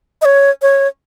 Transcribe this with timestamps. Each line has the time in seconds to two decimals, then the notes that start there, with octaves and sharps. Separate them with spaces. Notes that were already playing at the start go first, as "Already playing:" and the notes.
0.22 D#5
0.25 C#5
0.62 C#5